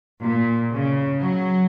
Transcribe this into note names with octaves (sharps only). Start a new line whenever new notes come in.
A#2
C#3
F#3